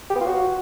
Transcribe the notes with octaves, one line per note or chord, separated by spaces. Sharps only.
G4
B3
F4
F#4